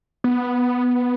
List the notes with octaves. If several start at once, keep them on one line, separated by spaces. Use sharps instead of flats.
B3